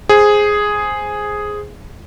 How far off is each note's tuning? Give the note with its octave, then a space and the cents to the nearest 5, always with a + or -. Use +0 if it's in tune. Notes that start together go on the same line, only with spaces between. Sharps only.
G#4 +0 C5 +0